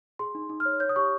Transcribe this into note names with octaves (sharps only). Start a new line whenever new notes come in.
G#4 C6
D#4
D#4
F6
C#5
C#5 G6
D#6
G4 C#6